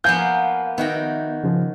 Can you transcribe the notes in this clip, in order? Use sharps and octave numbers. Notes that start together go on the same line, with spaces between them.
F3 A#3 B3 F5 G#5 G6
D#3 B3 F#4 E5 G5
C#3 F3